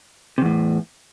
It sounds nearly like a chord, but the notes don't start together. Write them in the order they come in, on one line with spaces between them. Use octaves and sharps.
C3 E2 A2